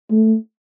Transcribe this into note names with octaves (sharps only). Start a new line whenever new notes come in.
A3